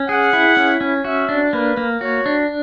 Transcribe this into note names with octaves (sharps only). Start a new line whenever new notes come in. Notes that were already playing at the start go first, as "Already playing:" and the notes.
Already playing: C#4
G#4 F#5
E4
C#4
C#4
F#4 E5
D4
A#3 B4
A#3
F#4 C#5
D4